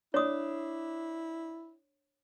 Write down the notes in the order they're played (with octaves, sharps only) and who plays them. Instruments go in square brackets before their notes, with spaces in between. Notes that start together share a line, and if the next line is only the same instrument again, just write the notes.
[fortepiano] D4 [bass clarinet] E4 [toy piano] C#5 D#6